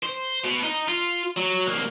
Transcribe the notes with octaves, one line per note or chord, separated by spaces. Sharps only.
C5
B2
D#4
F4
F#3
C2 A#3